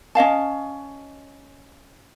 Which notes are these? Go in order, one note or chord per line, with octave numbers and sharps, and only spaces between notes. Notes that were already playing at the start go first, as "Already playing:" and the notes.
C#4 D#5 F5 A5